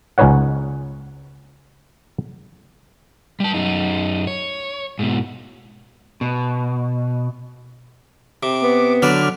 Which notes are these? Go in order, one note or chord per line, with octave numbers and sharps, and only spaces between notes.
C#2 C#4 D#4 B4 C#5 F#5
G3 A5
F#2 D#4
C#5
G#2 B2
B2
C3 D6
B3
D3 F#3 B4 D5 F6